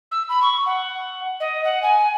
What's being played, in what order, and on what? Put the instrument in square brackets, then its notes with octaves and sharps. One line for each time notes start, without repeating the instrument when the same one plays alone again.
[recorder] E6
B5
C#6
F#5
D#5
F#5
G#5